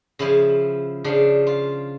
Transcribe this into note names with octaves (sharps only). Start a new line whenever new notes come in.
C#3 F3 E4
C#3 F3 D4
F4